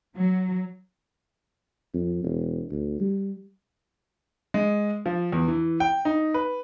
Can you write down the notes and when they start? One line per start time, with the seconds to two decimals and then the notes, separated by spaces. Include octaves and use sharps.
0.16 F#3
1.94 F2
2.24 E1
2.71 D2
3.00 G3
4.54 G#3
5.06 F3
5.32 E2
5.48 E3
5.80 G5
6.05 D#4
6.34 B4